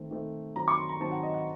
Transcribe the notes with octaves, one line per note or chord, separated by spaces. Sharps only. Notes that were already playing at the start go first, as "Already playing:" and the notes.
Already playing: D#3 A3 C4
D#3 A3 C4
D#3 F#3 C4 A#5
C#6
C6
A#5
D#3 F#3 C4 A5
F#5
D#5
F#5